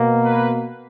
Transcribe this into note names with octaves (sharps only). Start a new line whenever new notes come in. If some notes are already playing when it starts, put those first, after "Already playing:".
Already playing: B2 A#3
B4